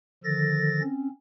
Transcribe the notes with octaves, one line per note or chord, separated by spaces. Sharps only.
D3 D#3 F3 A4 A6 A#6
C4 C#4